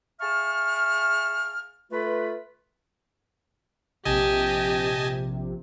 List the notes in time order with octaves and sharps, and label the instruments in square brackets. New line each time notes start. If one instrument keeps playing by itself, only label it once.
[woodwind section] G#4 E5 F5 A5 C#6 F6
A3 F4 B4
[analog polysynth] A#1 C3 [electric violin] G4 [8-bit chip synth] D#5 G#5 A5